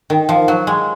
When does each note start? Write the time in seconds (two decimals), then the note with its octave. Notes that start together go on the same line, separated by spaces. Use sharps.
0.10 D#3
0.29 F3
0.48 F#3
0.67 G#3